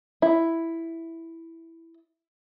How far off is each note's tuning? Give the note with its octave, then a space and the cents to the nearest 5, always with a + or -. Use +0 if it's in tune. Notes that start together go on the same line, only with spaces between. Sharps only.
E4 +0